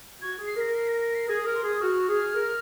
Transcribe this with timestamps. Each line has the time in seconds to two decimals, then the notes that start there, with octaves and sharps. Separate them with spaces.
0.21 F#4 G#6
0.38 G#4
0.47 C7
0.56 A#4 A#6
0.75 C7
0.88 A#6
1.01 A#6
1.15 C7
1.28 G#4 A#6
1.46 A#4
1.55 C6
1.63 G#4
1.69 D#6
1.81 F#4 F6
2.09 G#4
2.35 A#4